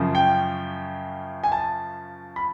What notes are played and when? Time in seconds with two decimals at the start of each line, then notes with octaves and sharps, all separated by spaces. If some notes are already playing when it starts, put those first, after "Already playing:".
Already playing: F#2 C#3 F3
0.15 G5
1.44 G#5
1.52 A5
2.36 B5